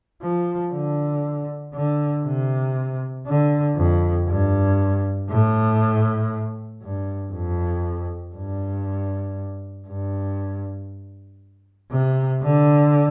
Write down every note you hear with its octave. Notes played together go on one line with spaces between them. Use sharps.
F3
D3
D3
C3
D3
F2
G2
A2
G2
F2
G2
G2
C3
D3